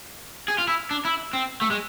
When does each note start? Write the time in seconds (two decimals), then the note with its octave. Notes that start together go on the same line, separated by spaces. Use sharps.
0.48 G#4
0.58 F4
0.68 E4
0.91 D4
1.05 E4
1.33 C4
1.61 A3
1.71 G#3